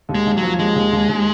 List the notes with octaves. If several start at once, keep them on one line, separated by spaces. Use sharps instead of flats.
D#2
G#3
D#2
F#3
F3
D#2 G#3
D#2
D#2
D#2